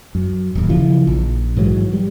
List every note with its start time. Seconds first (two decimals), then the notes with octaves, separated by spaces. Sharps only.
0.15 F#2
0.55 D1 D#2
0.69 C#3 E3 F3
1.07 A#1
1.57 G#2 E3 F#3
1.93 G3